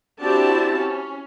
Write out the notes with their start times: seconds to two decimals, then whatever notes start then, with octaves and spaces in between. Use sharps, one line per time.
0.22 C4 D4 E4 F#4 G4 A5
0.76 C#4